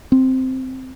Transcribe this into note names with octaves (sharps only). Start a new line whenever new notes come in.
C4